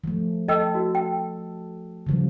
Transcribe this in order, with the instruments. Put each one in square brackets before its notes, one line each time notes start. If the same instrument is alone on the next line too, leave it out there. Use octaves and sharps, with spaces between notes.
[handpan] F3 A3
[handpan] A4 [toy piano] D#5 G5 E6
[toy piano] F#4
G5
[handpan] C#3 F3 G3